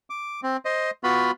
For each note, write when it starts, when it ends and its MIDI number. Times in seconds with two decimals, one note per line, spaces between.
0.10 0.40 86
0.43 0.57 60
0.65 0.91 72
0.65 0.91 75
1.04 1.31 59
1.04 1.31 65
1.04 1.31 66
1.04 1.31 83